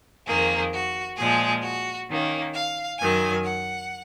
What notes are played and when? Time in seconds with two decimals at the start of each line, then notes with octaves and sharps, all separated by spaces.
0.27 F2 D#3 A#3 G#4
0.73 F#4
1.18 A#2 F3 G#3 G#4
1.64 F#4
2.09 D#3 A#3 C#4
2.54 F5
2.99 F#2 D#3 F#3 G#5
3.44 F#5